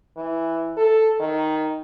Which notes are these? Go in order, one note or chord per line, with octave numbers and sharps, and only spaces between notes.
E3
A4
D#3